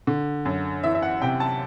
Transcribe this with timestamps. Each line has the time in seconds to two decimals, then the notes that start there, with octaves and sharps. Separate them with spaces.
0.07 D3
0.45 F#2
0.83 E3 E5
0.95 E5
1.02 F#5
1.22 C3 G5
1.40 A5